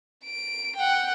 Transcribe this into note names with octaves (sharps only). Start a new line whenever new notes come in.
D7
F#5 G5